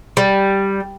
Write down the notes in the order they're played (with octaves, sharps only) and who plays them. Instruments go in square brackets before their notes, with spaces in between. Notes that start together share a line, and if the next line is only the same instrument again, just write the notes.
[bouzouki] G3